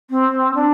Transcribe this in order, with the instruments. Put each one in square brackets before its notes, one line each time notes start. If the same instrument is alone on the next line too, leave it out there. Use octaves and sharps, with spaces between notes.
[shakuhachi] C4
D4